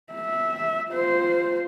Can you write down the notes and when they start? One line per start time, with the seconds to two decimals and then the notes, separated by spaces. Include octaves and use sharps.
0.13 E5
0.91 F4 C5